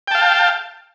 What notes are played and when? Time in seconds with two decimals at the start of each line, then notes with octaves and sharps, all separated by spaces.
0.08 G5
0.11 A5
0.15 F5